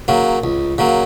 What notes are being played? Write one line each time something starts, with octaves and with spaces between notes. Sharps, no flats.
C#3 F#3 A#3
C#2
C#3 F#3 A#3